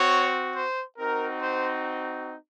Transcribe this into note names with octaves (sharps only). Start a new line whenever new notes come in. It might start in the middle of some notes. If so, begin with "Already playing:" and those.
Already playing: C4 F#4 C#5
C5
C4 D#4 F#4 A#4
C5